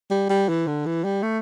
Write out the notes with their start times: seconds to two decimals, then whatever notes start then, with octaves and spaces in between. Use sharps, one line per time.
0.11 G3
0.30 G3
0.49 E3
0.67 D3
0.86 E3
1.05 G3
1.23 A3